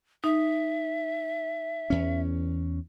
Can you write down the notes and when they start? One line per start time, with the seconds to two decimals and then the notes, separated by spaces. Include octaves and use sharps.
0.24 D#4 E5
1.90 E2 C#4